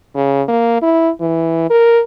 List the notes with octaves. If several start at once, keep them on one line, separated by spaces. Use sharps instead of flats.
C#3
A#3
E4
E3
A#4